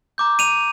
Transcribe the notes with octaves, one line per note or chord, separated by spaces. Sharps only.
A#5 D6 G6
D#7 F7